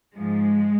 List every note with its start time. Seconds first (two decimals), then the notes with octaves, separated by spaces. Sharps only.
0.15 G#2 F3 G#3